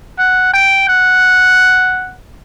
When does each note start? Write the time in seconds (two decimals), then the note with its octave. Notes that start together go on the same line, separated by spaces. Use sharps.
0.19 F#5
0.54 G5
0.89 F#5